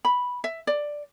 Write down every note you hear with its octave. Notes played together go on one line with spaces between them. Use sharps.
B5
E5
D5